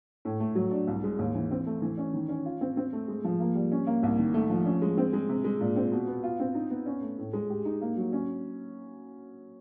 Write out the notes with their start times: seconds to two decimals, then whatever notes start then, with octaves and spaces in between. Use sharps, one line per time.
0.25 A2
0.40 A3
0.55 F#3
0.71 D4
0.87 C2
1.04 G#3
1.19 D#2
1.35 E3
1.51 C4
1.66 A3
1.82 E3
1.98 C#4
2.14 D#3
2.29 C#4
2.45 F4
2.61 C4
2.77 C4
2.93 A3
3.08 G#3
3.24 F3
3.40 A#3
3.55 G3
3.72 C#4
3.87 A#3
4.03 C2
4.18 D#3
4.34 A3
4.50 F3
4.66 C#4
4.82 G#3
4.98 C4
5.13 G#3
5.29 C3
5.44 G#3
5.61 A#2
5.76 C4
5.92 B2
6.07 B3
6.23 F4
6.40 C4
6.55 D#4
6.70 B3
6.86 C#4
7.02 A3
7.18 A2
7.33 G#3
7.50 G4
7.65 D#4
7.81 A#3
7.97 F#3
8.13 C#4